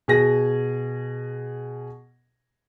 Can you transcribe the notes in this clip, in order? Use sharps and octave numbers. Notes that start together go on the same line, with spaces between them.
B2 G#4 A#6